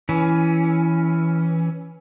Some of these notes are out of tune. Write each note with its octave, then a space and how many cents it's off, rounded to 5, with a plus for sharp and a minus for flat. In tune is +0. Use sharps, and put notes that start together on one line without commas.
E3 +0 C#4 +10